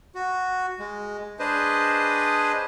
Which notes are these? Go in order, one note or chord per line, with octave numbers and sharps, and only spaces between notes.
F#4
G#3
D4 G#4 B4 C5 D#5